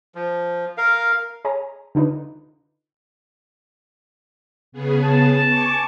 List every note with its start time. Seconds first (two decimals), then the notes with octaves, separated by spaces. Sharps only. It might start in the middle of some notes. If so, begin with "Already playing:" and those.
0.15 F3
0.77 A#4 F5
1.45 G#4 C#5 G#5 A#5
1.95 D3 D4 D#4 F4 B4
4.72 C#3 B3 G#4
5.04 A5
5.45 G#5 C#6 D6